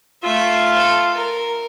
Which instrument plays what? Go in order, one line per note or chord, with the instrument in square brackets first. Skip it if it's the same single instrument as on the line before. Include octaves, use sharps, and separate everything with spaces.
[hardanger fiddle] A3 E5 [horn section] F4
[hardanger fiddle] A4
A#4